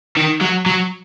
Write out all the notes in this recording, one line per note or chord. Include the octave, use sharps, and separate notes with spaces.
D#3
F#3
F#3